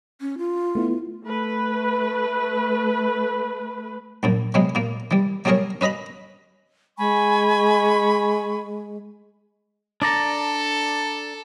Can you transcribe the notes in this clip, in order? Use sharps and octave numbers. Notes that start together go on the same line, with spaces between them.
C#4
F4
A3 B3 E4
A3 B4
A#1 F#2 A#2
C3 F#3 G#3 B3
A#2 A#3
E3 G3
F#3 G3 A3 G#4 A#4 C#5
C#4 B4 D#5 A#5 B5
G#3 G#5 B5 C#6
D4 A4 D5 A#5